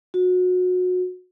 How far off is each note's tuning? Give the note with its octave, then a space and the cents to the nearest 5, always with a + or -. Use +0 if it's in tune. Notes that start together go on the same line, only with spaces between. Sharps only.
F#4 -25